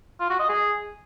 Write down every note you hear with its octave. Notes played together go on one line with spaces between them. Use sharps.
F4
F#4
D#5
G#4